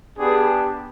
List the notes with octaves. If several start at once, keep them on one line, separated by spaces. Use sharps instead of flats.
B3 D4 G4 G#4